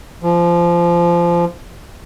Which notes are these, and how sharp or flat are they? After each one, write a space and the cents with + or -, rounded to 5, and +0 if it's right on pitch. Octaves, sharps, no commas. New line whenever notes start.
F3 -20